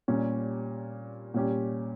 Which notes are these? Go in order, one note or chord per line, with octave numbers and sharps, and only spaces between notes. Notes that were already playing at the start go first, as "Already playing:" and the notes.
A#2 G3 C#4 G4
A#2 G3 C#4 G4